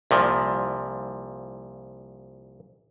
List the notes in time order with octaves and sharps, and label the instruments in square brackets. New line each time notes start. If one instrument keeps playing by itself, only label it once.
[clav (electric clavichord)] C2 A#2 F3